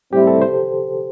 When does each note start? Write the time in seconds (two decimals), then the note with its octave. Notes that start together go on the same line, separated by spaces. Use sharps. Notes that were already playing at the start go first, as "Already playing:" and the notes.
0.12 A2 G3 C4 E4 G4
0.27 A4
0.42 C5